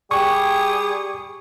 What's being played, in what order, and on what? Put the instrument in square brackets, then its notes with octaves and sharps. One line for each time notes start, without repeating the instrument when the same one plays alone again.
[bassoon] G3 [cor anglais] G4 [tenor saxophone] G#4 [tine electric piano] C#6